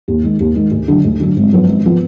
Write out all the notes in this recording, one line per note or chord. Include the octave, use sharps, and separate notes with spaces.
D#2
D#3 G#3
D#2
D#3 G#3
D2
D3 F#3 D4
D2
D3 F#3 D4
G#1
F#2 F3 B3
G#1
F3 B3